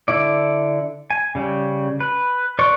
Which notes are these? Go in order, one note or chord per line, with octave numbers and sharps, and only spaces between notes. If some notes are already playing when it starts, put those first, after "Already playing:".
D3 E4 D5
G#5
C#3 G3
B4
B4 D5 C6 C#6